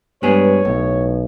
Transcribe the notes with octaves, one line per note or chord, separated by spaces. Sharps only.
G2 G#3 B3 G#4 C#5
B1 A2